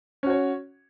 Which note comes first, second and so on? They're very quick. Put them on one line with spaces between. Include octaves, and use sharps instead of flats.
C#4 F#4 C#5